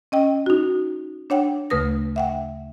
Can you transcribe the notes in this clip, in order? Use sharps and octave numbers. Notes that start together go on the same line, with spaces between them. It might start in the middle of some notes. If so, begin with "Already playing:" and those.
C#4 D#5 G5
D#4 F#4
D4 C#5 F#5 G5
D2 C#3 A3 B4 D#6 A#6
E5 F#5 G5